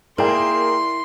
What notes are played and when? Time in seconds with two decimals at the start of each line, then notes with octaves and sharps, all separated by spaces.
0.18 A#3 E4 G#4 A#4 D5 G5 C6